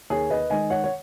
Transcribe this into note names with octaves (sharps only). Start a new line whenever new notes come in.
D#2 G#4 C#5
B4 D#5
D#3 G#3 D#5 G#5
C#5 F#5
C#5